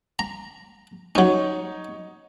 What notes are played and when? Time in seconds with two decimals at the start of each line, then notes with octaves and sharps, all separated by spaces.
0.19 A#5
1.15 F#3 C#4 D#4 C#5